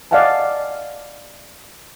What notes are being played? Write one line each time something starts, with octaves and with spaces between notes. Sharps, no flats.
D5 D#5 F5 F#5 G#5 A5